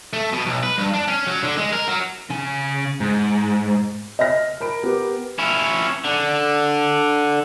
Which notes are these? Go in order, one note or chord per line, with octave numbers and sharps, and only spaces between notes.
A3
B2
B1
B4
G2
D4
C#4
F#3
D3
G#3
A#4
F#3
C#3 G#5
G#2
D#5 E5 F6 A#6
A#4 B5 D7
B3 G4 A#4
C#4 E4
D3